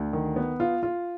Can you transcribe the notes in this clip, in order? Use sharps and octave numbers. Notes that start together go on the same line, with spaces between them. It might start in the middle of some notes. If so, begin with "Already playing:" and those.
Already playing: D2
D#3
B3
F4
F4